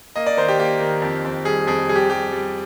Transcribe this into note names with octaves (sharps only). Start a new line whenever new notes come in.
A#3 D#5
D5
D#3 C5
G4
A#3 G4
D#3
F2
F2
G3 G#4
F2 G#4
G3 G#4
G4
G3 G4
G3